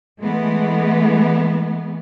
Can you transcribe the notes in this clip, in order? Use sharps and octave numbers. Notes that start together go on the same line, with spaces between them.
E3 G#3 A3 B3